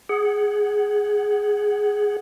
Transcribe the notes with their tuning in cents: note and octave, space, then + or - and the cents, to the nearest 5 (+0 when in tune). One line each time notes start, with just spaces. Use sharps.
G#4 +0 F#5 +15